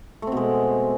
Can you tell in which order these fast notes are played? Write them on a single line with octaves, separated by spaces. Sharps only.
A3 C4 B2 G#3